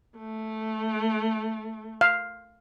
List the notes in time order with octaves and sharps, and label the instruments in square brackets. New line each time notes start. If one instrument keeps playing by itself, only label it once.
[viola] A3
[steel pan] F5